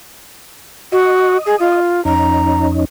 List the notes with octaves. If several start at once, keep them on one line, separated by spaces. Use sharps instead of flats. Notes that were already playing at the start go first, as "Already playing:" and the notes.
F#4 D#5
G#4
F4
F2 C#4 D#4 A#5